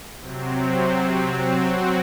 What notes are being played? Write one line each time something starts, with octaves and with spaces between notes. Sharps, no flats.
C3 F#3 C4
F#3 C4 F#4